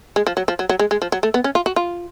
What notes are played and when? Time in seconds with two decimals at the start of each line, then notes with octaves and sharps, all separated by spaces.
0.16 G#3
0.27 F3
0.37 F#3
0.48 F3
0.59 F#3
0.69 F#3
0.79 G#3
0.91 G#3
1.02 F3
1.12 F#3
1.23 A3
1.34 B3
1.44 C#4
1.55 F4
1.66 F#4
1.76 F4